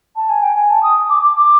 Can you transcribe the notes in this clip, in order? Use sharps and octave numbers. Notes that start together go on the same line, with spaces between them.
A5
G#5
G5
G#5
A5
D#6
D6
D6
D6